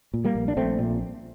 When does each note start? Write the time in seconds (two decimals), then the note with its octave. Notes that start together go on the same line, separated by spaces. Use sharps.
0.14 A#2
0.24 G3 A#3
0.35 A#1
0.48 D4
0.57 A#1 A3 C4
0.79 A#2